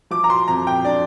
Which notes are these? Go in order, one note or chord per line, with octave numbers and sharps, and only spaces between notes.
F3 D6
A#5
C6
F2 A#5
G5
D4 D5